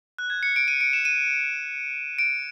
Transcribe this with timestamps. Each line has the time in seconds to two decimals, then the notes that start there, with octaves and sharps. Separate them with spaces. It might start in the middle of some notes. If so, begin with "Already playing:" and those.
0.18 F#6
0.30 G#6
0.43 C#7
0.56 D7
0.68 D#7
0.81 D7
0.93 E7
1.05 D#7
2.19 D7